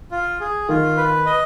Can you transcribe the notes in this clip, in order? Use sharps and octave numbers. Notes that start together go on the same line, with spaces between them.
F4
G#4
D#3 F4
B4
D#5